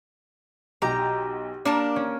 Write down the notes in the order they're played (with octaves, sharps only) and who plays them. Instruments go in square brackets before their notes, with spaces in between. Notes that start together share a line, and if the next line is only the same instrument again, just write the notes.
[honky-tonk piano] B1 F#4 G5 [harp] G4 [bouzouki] A#5
[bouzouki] A#3 A#4 A5 [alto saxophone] D4 [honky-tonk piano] D6
[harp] C#4